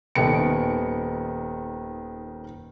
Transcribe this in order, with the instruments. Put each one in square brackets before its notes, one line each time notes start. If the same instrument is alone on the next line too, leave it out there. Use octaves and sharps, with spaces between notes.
[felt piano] D#1 D#3 B3 C#7